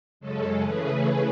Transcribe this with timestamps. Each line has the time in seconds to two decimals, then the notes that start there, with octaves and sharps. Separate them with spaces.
0.20 F#2 C#3 G#3 C#4 A4
0.61 C#3 E3 A3 C#4 G#4 B4